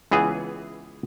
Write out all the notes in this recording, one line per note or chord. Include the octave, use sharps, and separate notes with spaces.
C#2 E3 B3 G#4